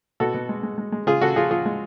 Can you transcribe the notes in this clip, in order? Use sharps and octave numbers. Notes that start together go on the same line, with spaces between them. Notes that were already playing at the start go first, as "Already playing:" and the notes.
B2 F#4 A4
B2
G#3
G#3
G#3
G#3
C#3 F4 G#4
C#3 F#4 A4
F3 F4 G#4
F3 F4 G#4
G#3